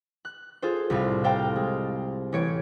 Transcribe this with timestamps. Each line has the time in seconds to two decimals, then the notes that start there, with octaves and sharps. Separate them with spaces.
0.25 F#6
0.62 F4 G#4 A4 C5
0.90 C2 A2 F5
1.24 A4 C5 F5 G5 A#5
1.56 G#3
2.32 A1 C#5 D7